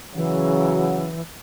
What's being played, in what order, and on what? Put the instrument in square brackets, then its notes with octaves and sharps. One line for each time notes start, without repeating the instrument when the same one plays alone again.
[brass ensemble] C#3 F#3 [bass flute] E3